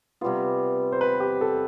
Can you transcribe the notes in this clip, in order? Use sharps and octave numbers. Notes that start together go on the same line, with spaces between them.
C3 G3 B3 F4
C5
B4
G4
A4